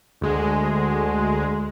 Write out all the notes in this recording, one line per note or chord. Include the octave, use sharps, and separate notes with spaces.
D2 G#3